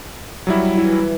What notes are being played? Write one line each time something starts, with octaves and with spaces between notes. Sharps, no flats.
F#3 G3 E4
E3